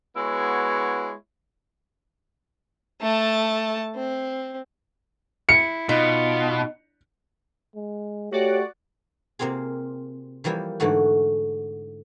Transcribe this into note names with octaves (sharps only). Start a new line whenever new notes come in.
G#3 B3 E4 F#4 C#5
A3 A5
C4
E4 C#7
B2 D#4 F4
G#3
A3 F#4 G4 C#5 D5 F#5
C3 A#3 C4 F4 G#4
E3 F3 G3 A#3 E4
G#2 D3 E3 A3 F#4